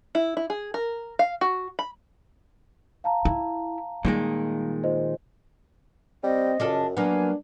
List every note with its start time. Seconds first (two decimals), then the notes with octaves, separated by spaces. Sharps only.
0.15 E4
0.37 E4
0.50 G#4
0.74 A#4
1.19 F5
1.41 F#4
1.79 B5
3.04 F5 A5 A#5
3.25 E4
4.05 A#2 D#3 G3 G#3
4.84 F4 C5 D#5
6.24 G3 C4 D#5
6.60 F#2 C#3 D4 F4 A4
6.97 F#3 A#3 B3 D4 G#5